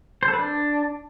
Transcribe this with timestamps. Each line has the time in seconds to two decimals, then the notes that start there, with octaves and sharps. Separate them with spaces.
0.23 C5
0.28 A4
0.33 B4
0.39 D4